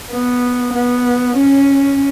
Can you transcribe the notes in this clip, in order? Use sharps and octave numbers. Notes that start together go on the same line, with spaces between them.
B3
B3
C#4